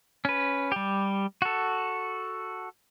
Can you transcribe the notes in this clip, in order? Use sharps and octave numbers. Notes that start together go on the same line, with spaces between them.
C#4 B4
G3 G4
F#4 A4